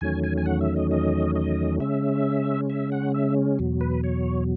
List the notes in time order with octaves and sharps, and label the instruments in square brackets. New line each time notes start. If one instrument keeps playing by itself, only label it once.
[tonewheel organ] E2 D#3 F#3 A3 C#4 G#5
G#5
G#5
F#5
E5
D#5
D#5
D#5
C#3 G#3 C#4 E5
E5
F#5
E5
E2 B2 F#3
B4
C#5